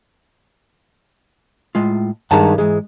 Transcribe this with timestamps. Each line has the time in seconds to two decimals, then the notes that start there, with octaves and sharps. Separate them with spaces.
1.75 A2 G#3 F4
2.31 G2 D#3 G#3 F#5 A5 A#5
2.58 G#2 E3 G#3